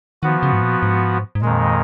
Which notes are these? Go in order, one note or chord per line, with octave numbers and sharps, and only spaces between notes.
D#3 F3 B3 F#4
C#3
G#2
A#2
G#2
G#2
F2 A#2 D#3 G#3